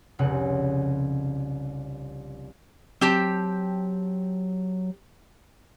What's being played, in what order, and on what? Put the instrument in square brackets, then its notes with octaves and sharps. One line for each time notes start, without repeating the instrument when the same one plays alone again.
[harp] F1 C2 C#3 F#5
[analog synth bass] F#3 [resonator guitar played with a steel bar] C4 G4 A5